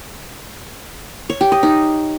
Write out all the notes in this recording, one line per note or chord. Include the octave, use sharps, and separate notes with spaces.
C#5
G4
D#5
D#4